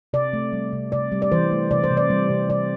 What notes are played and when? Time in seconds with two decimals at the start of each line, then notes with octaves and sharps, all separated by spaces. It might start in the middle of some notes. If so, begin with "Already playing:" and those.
0.13 C3 D5
0.33 A3
0.53 G3
0.73 C3
0.92 C3 D5
1.12 G3
1.22 D5
1.32 E3 C5
1.51 A3
1.71 C3 D5
1.84 C5
1.91 C3
1.97 D5
2.10 G3
2.30 C3
2.49 C3 D5